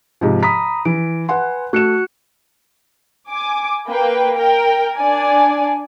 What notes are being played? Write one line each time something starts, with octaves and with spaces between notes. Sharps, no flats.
G#2 C3 F3
A#5 B5 D#6 B6
E3 D7
B4 F#5 G#5 C6
A3 F#4 F#6 C#7 E7
G#5 D6
A#3 B4 G5
A#4 G5
D4 D5 G#5